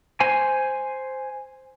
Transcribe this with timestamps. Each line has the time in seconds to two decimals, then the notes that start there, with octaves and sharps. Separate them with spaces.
0.20 C5 G#5